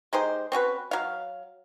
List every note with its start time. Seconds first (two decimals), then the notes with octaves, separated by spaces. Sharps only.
0.13 G#3 D#4 G4 C5
0.52 C4 C#4 F#4 B4
0.91 F#3 F5